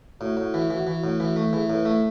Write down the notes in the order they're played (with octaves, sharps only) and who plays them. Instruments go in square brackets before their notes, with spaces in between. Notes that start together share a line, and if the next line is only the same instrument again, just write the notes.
[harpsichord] A2 [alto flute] F#4
[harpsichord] A2
E3
E3
E3
A2
E3
A3
[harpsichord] E3 [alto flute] G#4
[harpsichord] A2 [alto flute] A4
[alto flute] B4
[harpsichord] A3